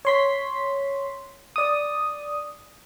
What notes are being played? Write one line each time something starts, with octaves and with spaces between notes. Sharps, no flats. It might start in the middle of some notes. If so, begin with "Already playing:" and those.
C#5 C6 B6
D5 D#6